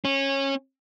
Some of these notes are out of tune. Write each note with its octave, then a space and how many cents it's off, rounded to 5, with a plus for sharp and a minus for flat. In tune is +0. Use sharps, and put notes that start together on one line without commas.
C#4 -20